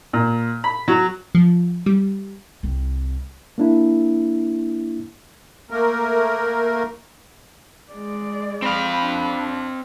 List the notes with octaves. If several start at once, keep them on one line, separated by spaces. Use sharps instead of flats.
A#2
B5
F#3
F3
G3
C2 C4
A#3 D4 E4
A3 A#3 A#4
G#3 D5
C4 F5 B5
D4